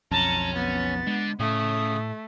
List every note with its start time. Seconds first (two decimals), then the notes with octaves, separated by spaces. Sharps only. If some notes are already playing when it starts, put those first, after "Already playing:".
0.12 B1 F2 C#4 A5 A#5
0.55 B3 A6
1.07 D3 G#3
1.40 A2 C#3 A3 D#6